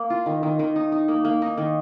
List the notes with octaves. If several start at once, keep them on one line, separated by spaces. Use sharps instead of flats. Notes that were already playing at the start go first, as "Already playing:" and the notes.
Already playing: A#3
F4
D#3
D#3
D#3
D#4
D#4
A#3
A#3
D#4
D#3